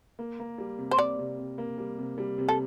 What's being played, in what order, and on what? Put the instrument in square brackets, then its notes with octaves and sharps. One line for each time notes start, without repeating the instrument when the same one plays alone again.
[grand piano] A#3
A#3
G3
C3
[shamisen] C5
[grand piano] C3 [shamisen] D5
[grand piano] C3
C3
A#3
G3
C3
G3
C3
[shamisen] A4